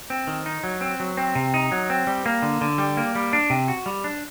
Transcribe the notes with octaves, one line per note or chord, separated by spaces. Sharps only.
C4
D#3
D#4
F#3
C4
F#3
C4
C3
D#4
F#3
C4
G3
A#3
D3
D3
G3
A#3
G3
D4
C3
F#4
G3
D4